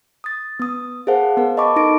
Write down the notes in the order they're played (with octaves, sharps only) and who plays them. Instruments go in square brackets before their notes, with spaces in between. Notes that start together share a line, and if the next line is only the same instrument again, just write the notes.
[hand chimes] D#6 A6
B3 D#6
G#4 A#4 C5 F5 F#5 A5
B3 A#4
D#5 A5 B5 C#6 D6
D#4 A4 D6 A#6 D7